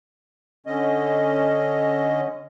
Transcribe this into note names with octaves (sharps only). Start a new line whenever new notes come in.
D3 C#4 D#5